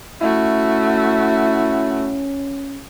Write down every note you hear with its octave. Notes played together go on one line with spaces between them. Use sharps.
A3 C#4 E4 F#4